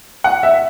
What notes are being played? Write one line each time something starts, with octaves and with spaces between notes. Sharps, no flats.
F#5
E5